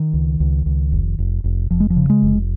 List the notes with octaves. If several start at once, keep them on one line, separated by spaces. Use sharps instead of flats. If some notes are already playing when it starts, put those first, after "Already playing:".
Already playing: D#3
C#2
C#2
C#2
F1
F1
F1
F1 F3
G#3
F3
C#3
G#3
F1